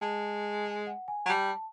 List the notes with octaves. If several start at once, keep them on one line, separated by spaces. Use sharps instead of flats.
G#3 A5
G#5
F#5
G#5
F#3
G3 A5